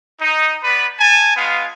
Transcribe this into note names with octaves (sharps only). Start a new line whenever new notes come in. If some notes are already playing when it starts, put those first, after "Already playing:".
D#4
B3 B4 D5 B5
G#5 A5
G#3 B3 F4 F5